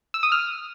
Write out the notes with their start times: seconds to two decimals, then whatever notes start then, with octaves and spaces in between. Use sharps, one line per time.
0.14 E6
0.23 D#6
0.32 F6